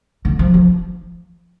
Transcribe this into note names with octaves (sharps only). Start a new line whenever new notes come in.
D3
F3
F3